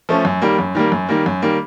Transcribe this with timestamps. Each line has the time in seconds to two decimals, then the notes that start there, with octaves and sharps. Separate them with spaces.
0.09 F3 A3 C#4
0.25 F#2
0.42 D#3 G3 A#3
0.59 F#2
0.75 D#3 G3 A#3
0.92 F#2
1.09 D#3 G3 A#3
1.26 F#2
1.42 D#3 G3 A#3